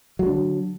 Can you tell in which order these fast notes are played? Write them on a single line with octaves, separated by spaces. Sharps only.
F#3 G#3 D4 D3